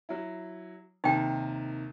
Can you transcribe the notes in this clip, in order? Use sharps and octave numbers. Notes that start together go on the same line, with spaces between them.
F#3 E4
D#2 C3 D#3 D#4 G5